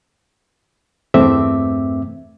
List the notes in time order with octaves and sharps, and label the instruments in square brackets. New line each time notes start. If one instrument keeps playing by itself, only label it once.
[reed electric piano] E2 G2 A3 C4 E5 D6